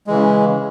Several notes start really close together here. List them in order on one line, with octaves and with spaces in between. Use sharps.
G#3 E3 C#3